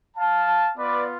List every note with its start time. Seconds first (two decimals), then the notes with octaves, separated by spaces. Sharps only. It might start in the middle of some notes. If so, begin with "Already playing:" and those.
0.17 F5 A5
0.77 B3 F4 B4 D5